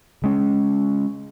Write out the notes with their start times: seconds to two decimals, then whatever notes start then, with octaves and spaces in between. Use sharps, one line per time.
0.22 C#3 G#3 C#4